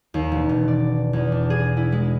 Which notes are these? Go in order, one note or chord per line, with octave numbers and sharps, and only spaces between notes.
D#2
E1
B2
D5
E2
D4
G#4
E4
G#3